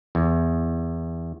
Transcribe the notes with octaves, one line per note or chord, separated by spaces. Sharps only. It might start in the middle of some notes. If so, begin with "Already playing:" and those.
E2